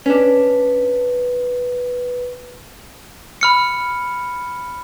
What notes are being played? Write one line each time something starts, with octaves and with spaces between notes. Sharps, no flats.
C#4 D4 B4
B5 F6 C#7